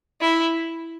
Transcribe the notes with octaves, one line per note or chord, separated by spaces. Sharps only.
E4